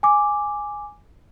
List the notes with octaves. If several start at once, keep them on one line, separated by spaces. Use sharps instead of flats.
G#5 D6